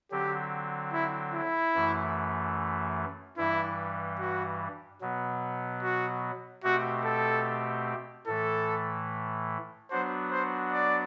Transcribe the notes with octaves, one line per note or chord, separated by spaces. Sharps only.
D3 F#3 C4 G4
E4
E4
F#2 E3 A3
G2 E3 G3 E4
F#4
B2 F#3 B3
F#4
B2 A3 C4 F#4 G4
A4
A2 E3 A3 A4
F#3 B3 D4 F#4 C5
C5
D5